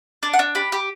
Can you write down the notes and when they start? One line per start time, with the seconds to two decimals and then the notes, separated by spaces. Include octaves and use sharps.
0.23 D4 D5
0.33 F#5
0.39 D4
0.55 G4 B5
0.72 G4